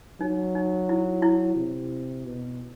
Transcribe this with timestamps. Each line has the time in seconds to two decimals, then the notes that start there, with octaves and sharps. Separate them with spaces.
0.21 F#3 D#4
0.55 D#4
0.89 E4
1.22 E4
1.57 C3
2.26 B2